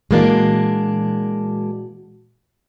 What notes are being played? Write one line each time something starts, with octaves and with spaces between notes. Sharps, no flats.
A#2 E3 G#3 A#3 D4 F#4